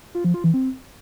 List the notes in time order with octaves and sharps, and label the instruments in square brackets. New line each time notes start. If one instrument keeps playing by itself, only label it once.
[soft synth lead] F4
F3
F4
E3
C4